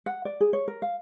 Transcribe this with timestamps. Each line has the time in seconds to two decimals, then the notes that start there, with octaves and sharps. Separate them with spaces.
0.06 F#5
0.25 D5
0.41 G#4
0.53 C#5
0.68 A#4
0.82 F5